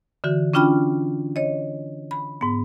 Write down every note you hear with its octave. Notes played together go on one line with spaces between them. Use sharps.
D3 E3 F#4
C#4 D4 F4 G5 B5 F6
C#5 D#5
B5
G#2 B3